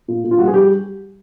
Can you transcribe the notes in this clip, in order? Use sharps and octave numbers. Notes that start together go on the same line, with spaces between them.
A#2
A#2
F4
G3 F#4
G#4
G3 G4